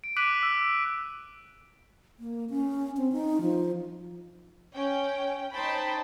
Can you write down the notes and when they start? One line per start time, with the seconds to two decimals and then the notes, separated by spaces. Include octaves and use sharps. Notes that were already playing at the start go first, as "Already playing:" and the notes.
0.04 D7
0.16 D6 F#6 B6 D7 D#7 F#7
0.43 E6
2.19 A#3
2.50 C#4
2.97 C4
3.12 D#4
3.41 F3
4.73 C#4 G5
5.53 D#4 C5 C#5 G5 A5 B5